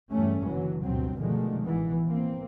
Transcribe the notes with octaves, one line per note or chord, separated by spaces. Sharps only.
E2 G2 G3 A3 C#4
F#1 D3 E3 F#3
G1 D2 G2 B2 F#3 C4
B2 D3 D#3 F3 G#3 A3
A1 E3 B3
A#3 C4